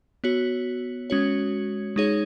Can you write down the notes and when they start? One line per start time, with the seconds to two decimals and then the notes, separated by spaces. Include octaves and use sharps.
0.24 B3 F#4 C#5
1.10 G#3 C#4 F#4 C#5
1.96 G#3 D#4 G#4 C#5